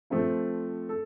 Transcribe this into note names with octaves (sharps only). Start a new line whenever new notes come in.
F3 A3 C4 F4
A4